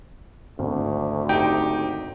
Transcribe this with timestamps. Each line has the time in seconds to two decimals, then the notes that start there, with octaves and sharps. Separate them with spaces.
0.59 G#1 D2
1.29 D#4 G4 G5